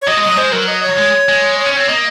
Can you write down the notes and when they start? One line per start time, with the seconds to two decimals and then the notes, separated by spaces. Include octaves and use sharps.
0.02 C#5
0.07 F#3 D#5
0.17 G#3
0.23 F#3 D#5
0.37 G#3 C5
0.52 F#3 A#4
0.67 D#5
0.83 C#5
0.98 G#3
1.28 G#3
1.59 C#5
1.66 C#4
1.74 C4 C#5
1.88 A#3 D#5